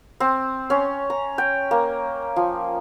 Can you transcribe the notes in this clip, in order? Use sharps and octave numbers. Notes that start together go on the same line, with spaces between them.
C4
C#4
A#5
G5
A#3
F3